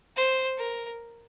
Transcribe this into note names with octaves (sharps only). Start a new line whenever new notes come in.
C5
A#4